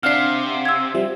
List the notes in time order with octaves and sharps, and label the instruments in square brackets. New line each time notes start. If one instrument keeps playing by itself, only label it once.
[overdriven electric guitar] C3 [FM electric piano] D4 F5 F#5 [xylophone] F6 C7
[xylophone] E6 G#6
[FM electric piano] F3 G3 E5